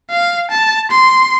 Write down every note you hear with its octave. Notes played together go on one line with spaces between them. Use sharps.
F5
A5
C6